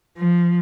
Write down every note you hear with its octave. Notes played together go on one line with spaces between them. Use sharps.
F3